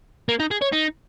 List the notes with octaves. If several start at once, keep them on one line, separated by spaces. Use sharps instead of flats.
A#3
D#4
G#4
C#5
D#4